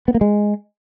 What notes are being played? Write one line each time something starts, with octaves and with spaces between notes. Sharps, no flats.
B3
A#3
G#3